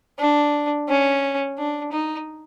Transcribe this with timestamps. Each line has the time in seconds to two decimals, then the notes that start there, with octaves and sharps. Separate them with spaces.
0.19 D4
0.88 C#4
1.58 D4
1.92 D#4